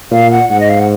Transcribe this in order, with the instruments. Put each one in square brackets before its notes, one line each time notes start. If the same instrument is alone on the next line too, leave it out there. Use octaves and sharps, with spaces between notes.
[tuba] A#2 [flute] F5
[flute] F#5
[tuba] G#2 [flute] F#5
[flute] D#5
F5
F#5